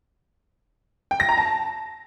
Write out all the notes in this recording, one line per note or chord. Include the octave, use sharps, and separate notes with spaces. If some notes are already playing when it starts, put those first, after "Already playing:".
G5
A#6
A#5
A5